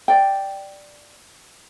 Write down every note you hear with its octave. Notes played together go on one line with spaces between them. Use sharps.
D5 G5